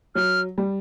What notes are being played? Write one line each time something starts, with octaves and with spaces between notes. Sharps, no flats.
F#3 F6
G3